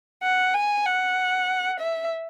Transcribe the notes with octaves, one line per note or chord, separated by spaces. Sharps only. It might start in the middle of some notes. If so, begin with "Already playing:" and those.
F#5
G#5
F#5
E5